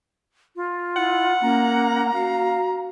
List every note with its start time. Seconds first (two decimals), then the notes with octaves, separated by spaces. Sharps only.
0.56 F4
0.96 E4 F#5
1.42 A#3 C#4 A#5
2.14 F#4 F5